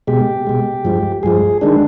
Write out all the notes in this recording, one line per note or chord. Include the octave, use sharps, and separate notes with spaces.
B2 G#3 G4
B2 G#3
G2 F3 G#3
G2 F3 G#3 G#4
D#3 G#3 D4